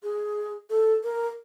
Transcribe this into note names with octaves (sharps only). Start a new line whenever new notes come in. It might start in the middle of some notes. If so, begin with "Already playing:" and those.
G#4
A4
A#4